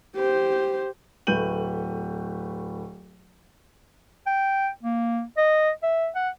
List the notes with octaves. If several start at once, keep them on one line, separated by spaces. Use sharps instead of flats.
G4 C5
D1 A3 B4 G6 D#7 F#7
G5
A#3
D#5
E5
F#5